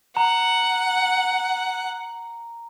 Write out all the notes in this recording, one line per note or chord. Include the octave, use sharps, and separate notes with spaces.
F#5 A#5